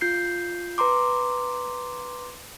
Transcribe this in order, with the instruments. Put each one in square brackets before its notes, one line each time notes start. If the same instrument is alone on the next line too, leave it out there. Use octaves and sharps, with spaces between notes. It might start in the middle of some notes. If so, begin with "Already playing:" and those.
[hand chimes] F4 G6 C7
B4 A#5 C6 D6